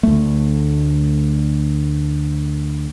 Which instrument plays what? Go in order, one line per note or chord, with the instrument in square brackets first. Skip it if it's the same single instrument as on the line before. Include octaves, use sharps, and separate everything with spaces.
[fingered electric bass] D2 A3